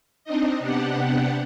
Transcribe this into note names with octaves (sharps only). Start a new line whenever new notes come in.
C4 D4 D#4 D#5
C3 B3 D4 G4 F#5